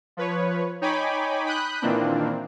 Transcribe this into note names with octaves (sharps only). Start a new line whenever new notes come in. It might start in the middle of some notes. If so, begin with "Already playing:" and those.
F3 B4 C#5
D#4 C#5 G5 G#5 B5 D6
B5 D#6 F#6 G6
A#2 D#3 E3 A#3 C4 D4